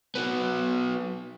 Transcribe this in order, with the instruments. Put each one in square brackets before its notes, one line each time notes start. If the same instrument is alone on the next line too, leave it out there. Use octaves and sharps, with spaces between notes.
[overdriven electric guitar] F#3 B3